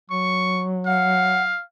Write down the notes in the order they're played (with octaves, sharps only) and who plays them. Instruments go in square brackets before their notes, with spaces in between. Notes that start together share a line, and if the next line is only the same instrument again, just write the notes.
[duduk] F#3 [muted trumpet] C#6
[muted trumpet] F5 [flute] F#5